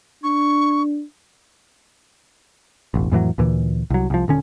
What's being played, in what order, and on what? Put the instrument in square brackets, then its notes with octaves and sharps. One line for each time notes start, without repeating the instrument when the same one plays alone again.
[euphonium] D4 [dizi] C#6
[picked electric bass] E1 A1
F2 A2 E3 F#3
D2 A#2 E3
C2 F#3
C2 F3
D#1 D3 C#4